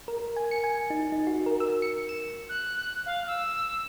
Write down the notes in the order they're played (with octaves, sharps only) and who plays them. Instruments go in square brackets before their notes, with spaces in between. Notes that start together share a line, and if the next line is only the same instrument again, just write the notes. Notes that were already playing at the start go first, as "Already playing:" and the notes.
[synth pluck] A#4
G#5
C#7
G#5
D#4
D#4
F#4
A#4
E6
C#7
E7
[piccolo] F#6
F5
E6